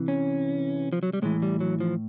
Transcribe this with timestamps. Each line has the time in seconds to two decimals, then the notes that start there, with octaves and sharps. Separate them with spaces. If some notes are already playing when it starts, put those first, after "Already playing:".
Already playing: C3 E3
0.08 C#4
0.93 F3
1.03 F#3
1.13 G3
1.22 A2 E3 G#3
1.42 G3
1.60 F#3
1.80 F3